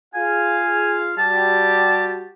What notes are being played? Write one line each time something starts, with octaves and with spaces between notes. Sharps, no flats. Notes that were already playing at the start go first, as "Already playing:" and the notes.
F4 G#4 F5 G#5
G3 F#4 G4 A5